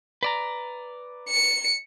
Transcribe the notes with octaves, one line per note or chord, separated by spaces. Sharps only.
B4 D5 A#5
C#7